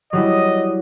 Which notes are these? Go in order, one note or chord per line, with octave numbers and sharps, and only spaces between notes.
F#3 G3 E4 D#5